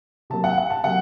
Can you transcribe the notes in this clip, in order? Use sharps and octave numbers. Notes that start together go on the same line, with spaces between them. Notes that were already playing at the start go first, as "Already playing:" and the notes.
C3 F#3 A#3 A5
F#5
F#5
A5
C3 F#3 A#3 F#5